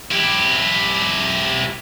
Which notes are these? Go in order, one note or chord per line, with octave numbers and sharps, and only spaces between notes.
E4 G4